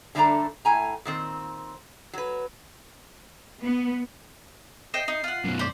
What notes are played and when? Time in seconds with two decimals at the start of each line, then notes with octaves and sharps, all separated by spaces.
0.15 D3 G3 A3 D4 D5 A#5
0.65 A2 G#5 A#5
1.05 A#2 D#3 C4
2.13 F#3 B4
3.62 B3
4.94 C5 D#5 G5 C7
5.08 D#4
5.24 F4 F#5
5.44 F#2 B2
5.59 C5 D5 B6